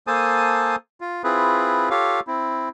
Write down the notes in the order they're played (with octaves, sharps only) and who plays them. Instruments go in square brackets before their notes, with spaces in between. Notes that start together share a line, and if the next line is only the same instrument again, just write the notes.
[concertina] A#3 A4 C5 G#5 A5 D#6
F4
C4 E4 F4 G#4 B4
F4 G4 A4 C#5 F5
C4 E4